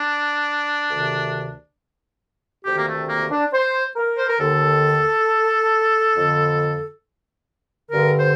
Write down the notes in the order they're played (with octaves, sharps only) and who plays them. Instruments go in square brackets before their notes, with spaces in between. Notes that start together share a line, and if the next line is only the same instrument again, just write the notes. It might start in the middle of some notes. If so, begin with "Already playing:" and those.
Already playing: [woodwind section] D4
D2 C3 D#3
D2 C3 D#3 G4
A#3
A3
A#3
D4
C5
A#4
C5
A#4
D#2 D3 A4
F2 D3
G2 D3 A#4
C5